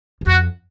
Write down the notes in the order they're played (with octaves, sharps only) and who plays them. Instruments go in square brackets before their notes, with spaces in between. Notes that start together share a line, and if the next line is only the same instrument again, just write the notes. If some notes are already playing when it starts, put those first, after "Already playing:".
[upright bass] E2
[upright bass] F2 [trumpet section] F#4